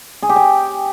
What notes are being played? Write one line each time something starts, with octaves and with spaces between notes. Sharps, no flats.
G#4
G4
G5